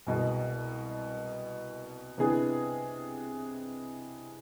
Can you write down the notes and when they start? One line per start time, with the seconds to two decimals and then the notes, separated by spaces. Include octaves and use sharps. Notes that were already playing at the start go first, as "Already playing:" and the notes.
0.07 C2 B2 G#3
2.18 C3 E3 B3 D4 G#4